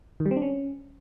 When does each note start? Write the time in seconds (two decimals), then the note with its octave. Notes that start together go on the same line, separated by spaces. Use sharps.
0.20 D#3
0.26 G3
0.31 C4
0.36 D4
0.42 C#4